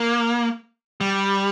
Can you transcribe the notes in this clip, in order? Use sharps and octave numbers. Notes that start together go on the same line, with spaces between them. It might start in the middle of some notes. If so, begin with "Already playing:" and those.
Already playing: A#3
G3